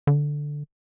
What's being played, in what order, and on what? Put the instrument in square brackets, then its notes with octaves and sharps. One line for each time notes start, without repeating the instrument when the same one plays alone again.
[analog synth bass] D3